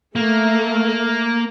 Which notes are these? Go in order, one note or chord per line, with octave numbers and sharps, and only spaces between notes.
A3 A#3